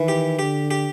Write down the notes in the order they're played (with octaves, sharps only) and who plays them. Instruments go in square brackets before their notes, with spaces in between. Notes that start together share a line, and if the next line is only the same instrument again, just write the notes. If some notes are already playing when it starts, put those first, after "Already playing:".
Already playing: [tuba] D#3 [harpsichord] E3
[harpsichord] G4
[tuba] D3 [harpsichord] G4
[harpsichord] G4